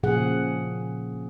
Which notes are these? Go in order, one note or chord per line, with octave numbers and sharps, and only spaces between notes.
A#2 C#3 F3 G#4 F#5